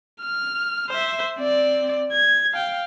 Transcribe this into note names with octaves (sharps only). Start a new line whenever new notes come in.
F6
C5 E5
C4 D5
G#6
F5 G5